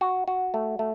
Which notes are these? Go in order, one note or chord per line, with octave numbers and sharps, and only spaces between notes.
F#4
F#4
A3
A3